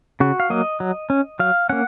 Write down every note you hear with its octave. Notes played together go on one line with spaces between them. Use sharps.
C#3 F#4
F5
F#3 A#3 D#5
F#3
C#4
F#3 F5
A#3 C#4 F#5